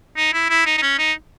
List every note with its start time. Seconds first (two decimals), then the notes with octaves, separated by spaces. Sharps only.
0.17 D#4
0.34 E4
0.50 E4
0.66 D#4
0.78 D#4
0.82 C#4
0.98 D#4